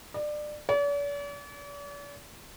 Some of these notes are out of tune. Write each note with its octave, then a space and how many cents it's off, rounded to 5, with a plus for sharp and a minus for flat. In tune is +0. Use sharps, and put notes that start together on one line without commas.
D5 +25
D5 -45